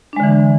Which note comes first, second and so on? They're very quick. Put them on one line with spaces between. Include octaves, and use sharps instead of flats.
D4 G#3 D3 E3